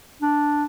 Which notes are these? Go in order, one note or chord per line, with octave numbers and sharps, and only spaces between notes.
D4